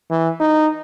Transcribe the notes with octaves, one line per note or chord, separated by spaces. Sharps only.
E3
D#4